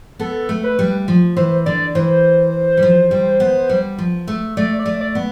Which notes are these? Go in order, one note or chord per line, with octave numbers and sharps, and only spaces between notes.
B3 A4
A3
B4
G3
F3
E3 C5
D3 D5
E3 C5
G3
F3
G3
B3
G3
F3
A3
A3 D5
D5
A3
D5
B3